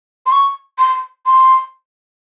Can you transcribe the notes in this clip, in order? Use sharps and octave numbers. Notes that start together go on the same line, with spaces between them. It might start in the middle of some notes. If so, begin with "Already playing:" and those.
C6
C#6
C6
C6